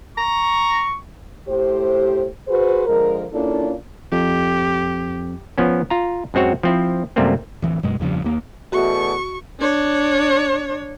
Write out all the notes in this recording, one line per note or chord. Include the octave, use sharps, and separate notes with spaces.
A#5 C#6
A2 G4 C5
F#4 G#4 B4 C5
D3 F3 G#3 A#4
A#3 C#4 D4 E4 F4 A4
F2 G4
F3 B3 C#4
F4 A#5
F#2 G#3 C4 F#4 C#5
F3 C4 E4
F#2 C3 G3 A3 A#3 C4
D1 E3
F#2 B2 G#3
E2 G2 C#3 F3
D#2 A#3
E2 B2 A3 F#4 C#6
D4 C#5